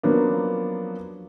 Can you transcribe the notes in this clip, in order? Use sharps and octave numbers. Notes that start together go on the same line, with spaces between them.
F3 F#3 A#3 B3 C#4 D4